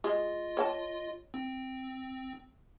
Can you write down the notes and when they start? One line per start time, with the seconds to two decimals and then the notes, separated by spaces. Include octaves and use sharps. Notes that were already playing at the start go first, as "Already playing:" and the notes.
0.04 G#3 F4 D#5
0.57 C#5 G5 A5
1.34 C4